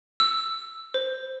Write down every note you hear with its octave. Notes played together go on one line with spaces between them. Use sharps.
E6
C5